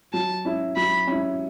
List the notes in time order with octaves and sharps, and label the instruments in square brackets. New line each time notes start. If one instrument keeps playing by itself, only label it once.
[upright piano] F#3 [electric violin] A5
[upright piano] C#4 E4
[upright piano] F#3 [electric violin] B5
[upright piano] C#4 E4